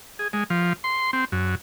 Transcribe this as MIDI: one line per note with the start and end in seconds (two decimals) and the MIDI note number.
0.19 0.28 68
0.33 0.44 56
0.50 0.73 53
0.84 1.11 84
1.13 1.25 60
1.32 1.55 42